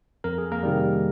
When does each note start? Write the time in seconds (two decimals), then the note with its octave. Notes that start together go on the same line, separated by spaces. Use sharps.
0.24 F2 A#4
0.38 G#4
0.52 A#3 A#4
0.63 C3 D#3 G3